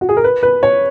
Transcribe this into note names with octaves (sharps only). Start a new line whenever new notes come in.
F#4
G#4
A#4
B4
B4
C#5